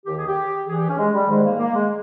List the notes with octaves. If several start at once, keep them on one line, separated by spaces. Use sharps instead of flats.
D#2 D#3 G4
G#4
G4
G2 E3 G#4
G4
C#4
G#3
G3
G#2 D#3 G#3
A#3
A#3
G#3